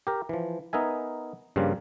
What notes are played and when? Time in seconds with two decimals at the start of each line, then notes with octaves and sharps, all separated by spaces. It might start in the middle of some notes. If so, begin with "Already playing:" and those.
0.07 G4 A#4
0.29 E3 F3
0.73 B3 D#4 A#4 E5 G#5
1.56 G2 C#3 F3 G3 A#3 F4